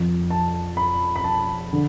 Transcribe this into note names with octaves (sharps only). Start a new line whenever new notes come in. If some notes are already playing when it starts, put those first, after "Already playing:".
Already playing: F2 F3
A5
B5
B5
A5
D3